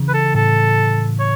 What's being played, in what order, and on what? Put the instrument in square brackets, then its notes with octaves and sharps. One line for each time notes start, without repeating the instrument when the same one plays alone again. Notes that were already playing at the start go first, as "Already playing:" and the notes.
Already playing: [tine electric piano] C#3 E3
[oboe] B4
A4
[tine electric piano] A2 [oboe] A4
[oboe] C#5